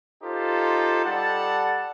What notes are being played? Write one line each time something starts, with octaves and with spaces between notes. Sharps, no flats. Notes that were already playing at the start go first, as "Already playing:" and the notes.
D#4 F4 G4 A4 C5
G3 A4 D5 F#5 A5